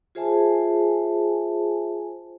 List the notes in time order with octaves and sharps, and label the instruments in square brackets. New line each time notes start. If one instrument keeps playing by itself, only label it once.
[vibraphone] F4 G#4 C5 E5 G#5 A5